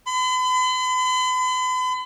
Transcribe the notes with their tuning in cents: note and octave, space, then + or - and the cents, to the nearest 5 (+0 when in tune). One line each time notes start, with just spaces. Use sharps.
B5 +45